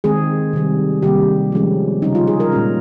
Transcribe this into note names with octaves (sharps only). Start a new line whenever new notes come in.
D#3 G#3 C4 G#4
C3 D#3 G3
C3 D#3 G3 A#3 G4
F3 G#3 C#4
C#3 G3 C#4 D#4
F4
G#4
A#4
A#2 G#3 C#4